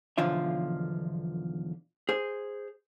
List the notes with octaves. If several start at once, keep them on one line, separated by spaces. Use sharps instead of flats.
B1 E2 D3 F3 F4 E5
G#4 C5